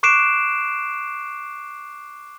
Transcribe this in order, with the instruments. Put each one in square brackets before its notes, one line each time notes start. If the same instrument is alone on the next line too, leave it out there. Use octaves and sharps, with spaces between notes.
[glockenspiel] C#6 D6 F#6 C7 D7 E7